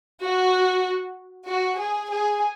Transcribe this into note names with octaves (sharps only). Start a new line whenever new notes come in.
F#4
F#4
G#4
G#4